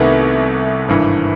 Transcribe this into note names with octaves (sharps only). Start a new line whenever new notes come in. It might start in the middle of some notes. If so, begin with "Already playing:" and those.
Already playing: C2 C3 D#3 A3 B3
G#1 G2 E3